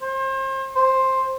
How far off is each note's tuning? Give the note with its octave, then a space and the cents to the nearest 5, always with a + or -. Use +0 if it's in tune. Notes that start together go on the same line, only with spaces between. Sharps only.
C5 +35
C5 +10